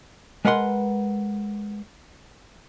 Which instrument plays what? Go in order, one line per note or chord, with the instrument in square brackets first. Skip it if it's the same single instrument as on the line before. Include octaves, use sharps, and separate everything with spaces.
[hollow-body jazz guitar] G#3 A#4 B4 F#5 C6